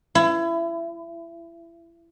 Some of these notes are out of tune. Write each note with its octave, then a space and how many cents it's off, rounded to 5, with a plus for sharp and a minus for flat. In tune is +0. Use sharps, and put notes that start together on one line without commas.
E4 +25